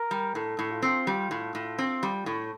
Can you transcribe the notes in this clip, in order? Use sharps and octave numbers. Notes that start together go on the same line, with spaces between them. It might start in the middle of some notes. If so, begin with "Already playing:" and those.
Already playing: A#4
G3
A2 A4
A2
F4
C4
G3
A2
A2
C4
G3
A2